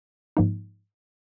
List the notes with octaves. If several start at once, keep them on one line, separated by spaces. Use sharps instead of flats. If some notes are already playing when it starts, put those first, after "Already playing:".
G#2 F3 A#3 D#4